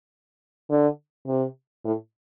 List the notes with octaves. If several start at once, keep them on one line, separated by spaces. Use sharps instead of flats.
D3
C3
A2